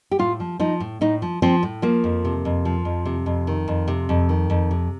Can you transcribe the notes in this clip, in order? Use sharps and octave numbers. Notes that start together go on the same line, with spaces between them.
G4
A2 F4
F3
F3 D#4
A2
A2 D#4
F3
F3 C4
A2
F3 A#3
F2
C3
F2
F3
F2
C3
F2
D#3
F2
C3
F2
D#3
F2
C3